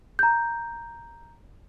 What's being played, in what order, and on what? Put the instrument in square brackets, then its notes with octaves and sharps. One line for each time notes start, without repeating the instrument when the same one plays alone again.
[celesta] A#5 G6